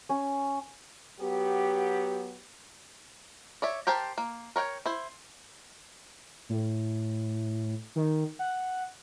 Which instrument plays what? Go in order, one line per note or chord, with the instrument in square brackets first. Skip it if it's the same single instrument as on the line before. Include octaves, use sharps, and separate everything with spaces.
[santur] C#4
[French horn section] F#3 B3 G4
[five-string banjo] C#5 D5 E5
G4 A#4 C5 G5 A5
A#3
A#4 C#5 F#5 G5
E4 C5
[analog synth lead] A2
D#3
F#5